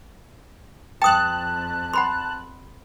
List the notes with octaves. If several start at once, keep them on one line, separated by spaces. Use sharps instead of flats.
F2 G5 A5 D#6 F#6
F#5 B5 C6